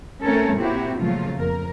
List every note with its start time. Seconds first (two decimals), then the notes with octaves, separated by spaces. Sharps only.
0.24 A3 C4 C#4 A4 A#4 C#5
0.57 A#2 A#3 C4 E4 F#4 G4
0.97 A#2 C#3 F3 F#3 A3 F4
1.38 F2 A#4